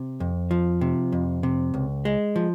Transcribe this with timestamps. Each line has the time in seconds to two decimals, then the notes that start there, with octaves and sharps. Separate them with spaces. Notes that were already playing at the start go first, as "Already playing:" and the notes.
Already playing: C3
0.20 F2
0.51 F3
0.81 C3
1.12 F2
1.43 C3
1.74 C#2
2.05 G#3
2.36 F3